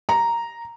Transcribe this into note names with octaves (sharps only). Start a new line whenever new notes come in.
A#5